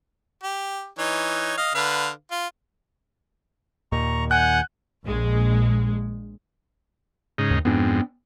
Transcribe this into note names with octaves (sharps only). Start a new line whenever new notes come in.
G4
E3 D#4 C#5
D#5 F5
D3 B4 F5
F4
D#2 A#2 D#3 A#5 C#6
F#5 G#5 F#6 G6
A#1 G#3
G#2 C#3 D#4
D#2
F2 G#2 B3 D4